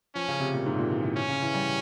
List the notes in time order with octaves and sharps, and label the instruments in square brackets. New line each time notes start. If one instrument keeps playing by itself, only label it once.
[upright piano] F3 [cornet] C#4
[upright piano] C#3
C3
A#2
G#2
C3
A#2
E3
E3
[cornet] C#4
[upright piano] C#3
E3
G3